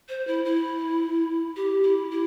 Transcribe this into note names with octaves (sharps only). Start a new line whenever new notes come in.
C5
E4
E4
G4
E4
E4